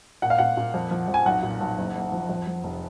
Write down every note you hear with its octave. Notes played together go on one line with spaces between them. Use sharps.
A#2 F#5
F5
A#2 F#5
A#2
F2
F3
F2
G#5
B1 F#5
A#2
B1
F#1
F#1
F3
F2
F2
F1